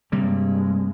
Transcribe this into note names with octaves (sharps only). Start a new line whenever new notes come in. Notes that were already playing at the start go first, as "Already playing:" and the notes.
G2 C3 G3 G#3 A#3